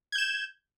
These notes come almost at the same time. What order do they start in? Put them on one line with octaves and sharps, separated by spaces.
G#6 G6 E7